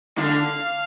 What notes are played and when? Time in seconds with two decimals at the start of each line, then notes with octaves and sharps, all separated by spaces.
0.18 D3 F5